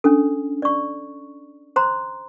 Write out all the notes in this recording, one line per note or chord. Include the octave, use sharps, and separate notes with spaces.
C#4 D4 A4
D5 C#6
C5 A#5 C6